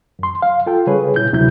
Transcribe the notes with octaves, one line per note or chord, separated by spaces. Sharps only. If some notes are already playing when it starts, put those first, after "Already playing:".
F#2 C6
F5
F4 A4 G5
C#3 G3 G#4 B4 C#5
A#2 E4 G6
D2 C3 F#3 E4 G6